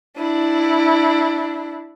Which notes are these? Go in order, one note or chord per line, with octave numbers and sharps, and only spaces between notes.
D4 E4